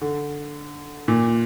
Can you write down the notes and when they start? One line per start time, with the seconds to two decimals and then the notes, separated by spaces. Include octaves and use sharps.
0.02 D3
1.08 A#2